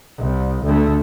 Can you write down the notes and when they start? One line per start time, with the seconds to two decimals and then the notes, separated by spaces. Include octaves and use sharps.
0.18 C2
0.64 D2 A3